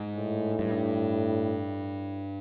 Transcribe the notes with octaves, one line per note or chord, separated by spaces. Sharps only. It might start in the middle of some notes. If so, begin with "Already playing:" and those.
Already playing: G#2
A2
G2